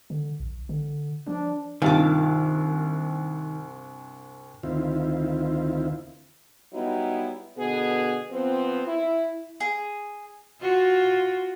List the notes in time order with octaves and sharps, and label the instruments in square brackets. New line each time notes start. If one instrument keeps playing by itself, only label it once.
[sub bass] D3
A#1
D3
[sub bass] F3 [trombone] D4
[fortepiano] C2 G2 [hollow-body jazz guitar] D#3 [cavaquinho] F4 A5 D6
[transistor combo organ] D2 D#3 C4 E4 F4
[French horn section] F#3 G3 B3 D#4 E4
B2 D3 B3 G#4
F3 B3 C4
E4
[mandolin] G#4
[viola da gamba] F4 F#4